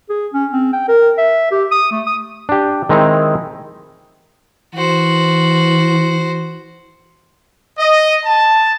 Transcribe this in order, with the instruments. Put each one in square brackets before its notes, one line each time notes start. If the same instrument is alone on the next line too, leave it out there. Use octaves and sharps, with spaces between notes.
[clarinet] G#4
C#4
C4
G5
A#4
E5
G4
D#6
A3
D#6
[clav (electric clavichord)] D4 G4
D#3 G#3 C4 D#4 E4
[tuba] E3 [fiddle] F#4 C5
[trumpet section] D#5
A5